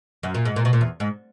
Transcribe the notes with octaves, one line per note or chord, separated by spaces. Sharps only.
F#2
A#2
G#2
A#2
B2
A#2
E2
G#2